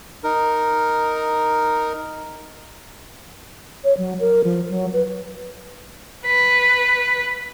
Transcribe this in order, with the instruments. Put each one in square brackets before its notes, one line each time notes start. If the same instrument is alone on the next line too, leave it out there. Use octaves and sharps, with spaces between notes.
[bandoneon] D#4 A#4
[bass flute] C#5
F#3
A#4
F3
F#3
B4
[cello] B4